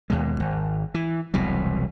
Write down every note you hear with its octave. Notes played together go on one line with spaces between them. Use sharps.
D#2 B2 G#3
G#1
E3
E1 C2 B2 F#3